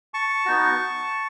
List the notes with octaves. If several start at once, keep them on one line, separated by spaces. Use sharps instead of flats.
A5 C#6
B3 D#4 F#4